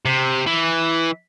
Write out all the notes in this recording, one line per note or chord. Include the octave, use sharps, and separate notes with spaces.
C3
E3